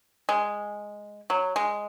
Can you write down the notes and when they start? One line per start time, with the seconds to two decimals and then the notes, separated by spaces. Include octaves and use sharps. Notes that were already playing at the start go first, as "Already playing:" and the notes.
0.29 G#3
1.30 F#3
1.56 G#3